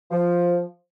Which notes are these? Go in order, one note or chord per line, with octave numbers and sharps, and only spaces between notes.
F3